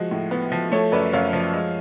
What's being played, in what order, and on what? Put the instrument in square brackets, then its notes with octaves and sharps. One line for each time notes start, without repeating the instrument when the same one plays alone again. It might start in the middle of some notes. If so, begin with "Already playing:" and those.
Already playing: [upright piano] F3 G#3 F#4
A2
B3
F3
A3 A4 C#5
F#2 B4 D5
F#2 C#5 F5
F3
G#3